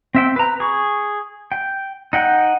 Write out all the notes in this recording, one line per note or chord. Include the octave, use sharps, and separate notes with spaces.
C4 E5 G5
B4 A#5
G#4 C#6
G5
D#4 F#5 G5